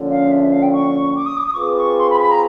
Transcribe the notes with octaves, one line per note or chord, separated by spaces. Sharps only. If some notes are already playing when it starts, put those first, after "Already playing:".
Already playing: D3 F3 A#3 C#4
F5
E5
E5
F5
G5
C#6
D6
D#6
D6
D#6
C#6
C4 F4 G#4 B4 D6
C#6
C6
B5
B5
A#5